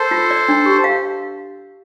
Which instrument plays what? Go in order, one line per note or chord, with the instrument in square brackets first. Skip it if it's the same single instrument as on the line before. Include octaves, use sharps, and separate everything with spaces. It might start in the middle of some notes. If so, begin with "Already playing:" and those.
Already playing: [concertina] A4 C5 [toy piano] A#4
[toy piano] F4
D5
D4
G4
F5